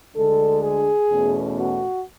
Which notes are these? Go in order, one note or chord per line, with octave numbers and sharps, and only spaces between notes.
D2 D3 G#3 D4 A4
G#4
E2 B2 A3 C#4
F#4